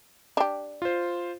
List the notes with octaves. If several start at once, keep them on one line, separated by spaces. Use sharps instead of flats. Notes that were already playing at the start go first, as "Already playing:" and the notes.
D4 G4
F4 C5